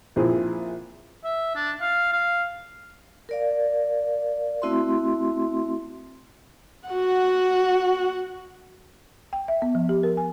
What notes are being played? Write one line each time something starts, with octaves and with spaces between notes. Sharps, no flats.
A#1 E3 C4 E4 F4 G#4
E5
D4
F5
F5
A#4 D5 F5
A3 C4 E4 F#4 E5 C6
F#4 F#5
G5
E5
B3
F3
G4
A#4
G#5